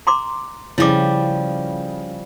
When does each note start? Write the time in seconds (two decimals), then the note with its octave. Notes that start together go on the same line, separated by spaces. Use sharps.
0.07 A#5 C6 D6
0.78 C#3 F3 G3 C#4 E4 D6